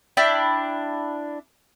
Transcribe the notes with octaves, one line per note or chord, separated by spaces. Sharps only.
D4 E4 G5 B5